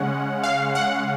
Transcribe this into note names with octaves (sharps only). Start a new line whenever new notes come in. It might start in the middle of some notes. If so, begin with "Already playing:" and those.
Already playing: C#3 G#3 C#4 F#5
F5
F#5